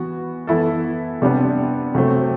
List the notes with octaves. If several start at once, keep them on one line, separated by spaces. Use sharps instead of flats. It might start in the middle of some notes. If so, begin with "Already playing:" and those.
Already playing: E3 B3 F#4
E3 B3 E4 A4
C3 G3 B3 D4
C3 F#3 A3 C4